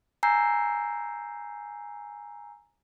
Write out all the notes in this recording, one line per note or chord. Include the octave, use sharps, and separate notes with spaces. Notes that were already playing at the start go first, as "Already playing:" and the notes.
G#5 A#5 E6 G6 C7